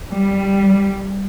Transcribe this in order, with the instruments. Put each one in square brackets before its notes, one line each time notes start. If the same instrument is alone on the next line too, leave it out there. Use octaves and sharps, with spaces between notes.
[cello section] G3